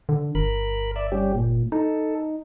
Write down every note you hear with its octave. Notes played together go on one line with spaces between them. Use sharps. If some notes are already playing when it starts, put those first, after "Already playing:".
D3
G1 A#4 B5
D5 E5
G3 C#4 G4
A#2
D#4 A4